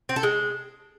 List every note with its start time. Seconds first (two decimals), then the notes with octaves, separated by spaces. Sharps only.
0.09 C4
0.16 A4
0.23 G#3